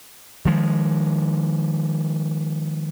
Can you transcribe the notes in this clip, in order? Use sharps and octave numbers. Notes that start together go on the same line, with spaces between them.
D#3 F3 G#3